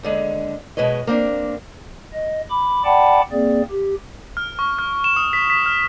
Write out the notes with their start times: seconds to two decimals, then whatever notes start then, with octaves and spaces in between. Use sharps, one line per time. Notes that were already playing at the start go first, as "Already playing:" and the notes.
0.03 D#2 D3 G#3
0.77 B2 G#3 B4 C#5 D#5
1.07 A#3 C4 D4
2.13 D#5
2.50 B5 D6
2.85 D5 F#5 G5 A5 B5 D6
3.32 A#3 C4 G#4 D5
3.71 G4
4.37 F6
4.59 C#6
4.79 F6
5.04 E7
5.16 D#6
5.33 B6
5.50 B6
5.66 F6